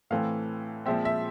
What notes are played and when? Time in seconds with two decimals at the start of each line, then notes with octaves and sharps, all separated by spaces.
0.10 A2 E3 A3 C4 F5
0.86 A#2 F3 G#3 C4 E5
1.05 E5